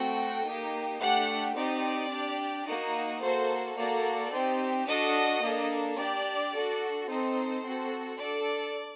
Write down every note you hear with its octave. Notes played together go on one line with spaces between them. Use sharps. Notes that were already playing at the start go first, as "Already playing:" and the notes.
Already playing: A3 C4 F#4 A4 G5
A#3 D#4 G4
A3 D4 G4 F#5
C4 D#4 G4 D5
D4 G4
A#3 D#4 F#4
A#3 F#4 A4 C5
A#3 F#4 A4 D5
C4 D#4 G4
D4 F#4 A4 D#5
A#3 D4 A4
D4 G4 D5
D4 F#4 A4
C4 D#4 A4 C5
C4 F#4 A4
D4 A4 D5